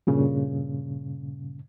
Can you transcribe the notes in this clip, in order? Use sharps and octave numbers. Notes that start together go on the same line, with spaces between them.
G2 A#2 C#3